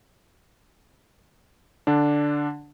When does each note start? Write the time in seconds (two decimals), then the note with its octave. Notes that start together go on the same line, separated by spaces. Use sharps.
1.87 D3 D4